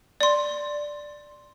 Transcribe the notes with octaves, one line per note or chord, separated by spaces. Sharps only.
D5 C6